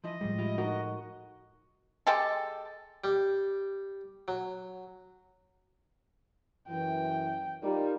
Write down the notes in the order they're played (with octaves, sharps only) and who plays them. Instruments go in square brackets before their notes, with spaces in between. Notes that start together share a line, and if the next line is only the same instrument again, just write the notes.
[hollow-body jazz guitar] F3 E4 [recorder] D#5
[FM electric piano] A2 F3 G#3 [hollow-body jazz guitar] G3
[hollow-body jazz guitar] E4 F4 G4
[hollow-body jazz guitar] D#4 A4 A#4 [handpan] F#4
[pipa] G#3 G4 A4
[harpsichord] G3
F#3
[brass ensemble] F#2 E3 [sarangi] G5
[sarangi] G3 [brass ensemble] D#4 F4 A#4